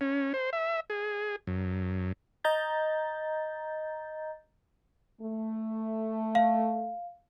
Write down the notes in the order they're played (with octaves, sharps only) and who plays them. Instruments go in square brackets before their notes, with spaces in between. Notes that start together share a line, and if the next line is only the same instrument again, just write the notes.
[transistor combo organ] C#4
C5
E5
G#4
F#2
[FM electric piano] D#5 A#5 G6 A6
[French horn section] A3
[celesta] F5